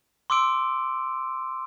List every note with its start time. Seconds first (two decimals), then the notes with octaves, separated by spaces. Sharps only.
0.30 C6 D6 E6 D7